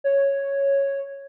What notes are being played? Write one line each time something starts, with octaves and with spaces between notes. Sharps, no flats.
C#5